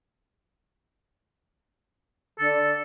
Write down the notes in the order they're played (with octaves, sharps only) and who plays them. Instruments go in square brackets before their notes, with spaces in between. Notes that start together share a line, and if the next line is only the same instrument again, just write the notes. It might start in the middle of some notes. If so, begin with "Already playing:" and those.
[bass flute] D3 [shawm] A4